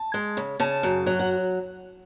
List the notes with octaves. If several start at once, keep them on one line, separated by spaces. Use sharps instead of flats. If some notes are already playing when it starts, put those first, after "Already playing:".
Already playing: A5
G#3
C#3
C#3 A5
F#2
F#3
F#5